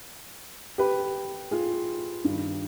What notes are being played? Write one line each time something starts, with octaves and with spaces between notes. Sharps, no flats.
G4 B4
F4 G#4
G2 D#3